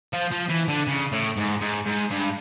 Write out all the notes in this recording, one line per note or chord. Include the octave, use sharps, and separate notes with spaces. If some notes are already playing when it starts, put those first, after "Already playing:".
F3
F3
E3
D3
C#3
A2
G#2
G#2
G#2
G2